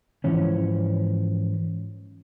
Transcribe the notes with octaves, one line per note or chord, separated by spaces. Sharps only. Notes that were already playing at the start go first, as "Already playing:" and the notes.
G#2 E3 F3 C#4